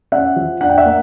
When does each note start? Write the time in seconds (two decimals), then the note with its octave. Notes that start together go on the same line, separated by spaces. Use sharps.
0.12 C#4 E5 F#5
0.36 F3
0.61 D4 F#5
0.69 G5
0.78 E5 F#5
0.85 A#3